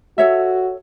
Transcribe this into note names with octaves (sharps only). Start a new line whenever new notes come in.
F#4 A4 C#5 E5